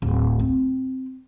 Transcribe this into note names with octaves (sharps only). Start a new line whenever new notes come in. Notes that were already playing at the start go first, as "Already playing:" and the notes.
D1
C4